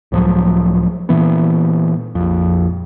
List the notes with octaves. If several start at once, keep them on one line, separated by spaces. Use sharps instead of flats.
C#2 A2 F3 F#3
A#2 E3 B3
A#1 F2